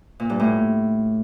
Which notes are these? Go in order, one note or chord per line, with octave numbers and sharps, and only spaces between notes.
A#2
G2
A2